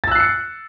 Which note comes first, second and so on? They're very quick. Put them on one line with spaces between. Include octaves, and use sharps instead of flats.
A6 E6 F#6 C7 C#7